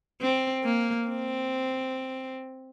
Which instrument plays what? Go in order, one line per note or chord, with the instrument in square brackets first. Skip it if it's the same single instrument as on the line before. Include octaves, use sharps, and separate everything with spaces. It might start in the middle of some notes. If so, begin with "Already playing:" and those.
[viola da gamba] C4
A#3
C4